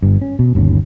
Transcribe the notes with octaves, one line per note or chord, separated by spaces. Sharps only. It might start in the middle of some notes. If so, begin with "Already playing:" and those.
G1 G2
C#4
B2
G1 D#2 C#4